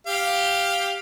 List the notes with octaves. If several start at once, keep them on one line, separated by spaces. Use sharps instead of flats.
G4 F5